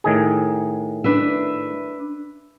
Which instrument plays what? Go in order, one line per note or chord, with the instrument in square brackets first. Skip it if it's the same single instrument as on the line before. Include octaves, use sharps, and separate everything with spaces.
[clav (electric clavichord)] A2 D#3 G#4
[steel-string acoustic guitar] D4 B4 E5